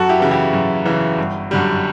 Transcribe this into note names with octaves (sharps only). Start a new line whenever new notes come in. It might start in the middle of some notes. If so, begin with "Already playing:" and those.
Already playing: F#2 F#4 A4
E4 G4
C#3 E3
E4 G4
F#2
C#3 E3
G1
F#2 D3 G3